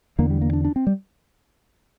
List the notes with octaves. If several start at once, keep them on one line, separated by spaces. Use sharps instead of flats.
E2 D3 A#3
G3
A#3
D4
D4
C4
G3